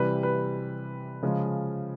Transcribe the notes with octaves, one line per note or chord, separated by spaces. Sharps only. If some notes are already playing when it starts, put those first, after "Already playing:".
Already playing: C3 E3 G3 B4
B4
C#3 F3 G#3